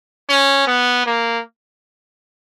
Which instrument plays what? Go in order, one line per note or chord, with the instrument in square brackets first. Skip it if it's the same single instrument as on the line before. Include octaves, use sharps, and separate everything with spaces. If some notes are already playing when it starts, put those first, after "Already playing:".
[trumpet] C#4
B3
A#3